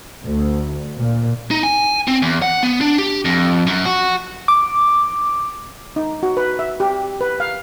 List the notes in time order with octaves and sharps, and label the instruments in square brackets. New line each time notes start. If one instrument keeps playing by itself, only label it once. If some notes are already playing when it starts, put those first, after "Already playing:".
[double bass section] D2
A#2
[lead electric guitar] D#4
G#5
C4
E2
F#5
B3
D4
G4
F2
F#2
F#4
[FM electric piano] D6
[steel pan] D#4
F#4
B4
E5
G4
B4
F5